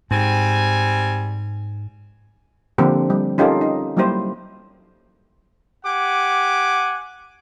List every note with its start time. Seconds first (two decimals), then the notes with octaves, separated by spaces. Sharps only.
0.11 G#2 G3 C4 G#5
2.78 D3 F3 A#3 C4 D4 G4
3.10 G3
3.38 C#4 D#4 F4 G4 A4 A#4
3.61 D#4
3.97 F#3 G3 A#3 E4 G4 C5
5.86 G4 F#5 G#5 D6